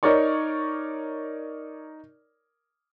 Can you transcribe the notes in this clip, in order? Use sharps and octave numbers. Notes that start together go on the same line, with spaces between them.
D#4 A#4 C#5 D5 C#6